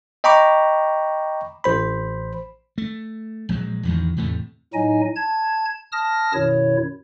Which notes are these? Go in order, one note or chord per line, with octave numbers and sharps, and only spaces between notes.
D#5 G5 A#5 B5 C#6 D6
A1 C5 B5
A3
A#1 F#3 G#3
A1 E2 D#3 F#3
E2 A2 C3 A3
A2 F#3 D#4 D#5 G#5
A5 G#6
A5 D#6 F6 A#6
F#2 B2 D#3 E4 C#5